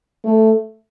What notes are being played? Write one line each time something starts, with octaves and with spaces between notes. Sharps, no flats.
A3